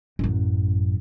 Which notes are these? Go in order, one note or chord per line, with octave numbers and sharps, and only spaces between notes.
A1 F#2